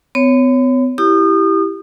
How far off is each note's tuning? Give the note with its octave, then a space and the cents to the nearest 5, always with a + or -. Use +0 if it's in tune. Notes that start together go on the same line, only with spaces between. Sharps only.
B3 +45 C#5 +0
E4 +0 G4 +0 D#6 -35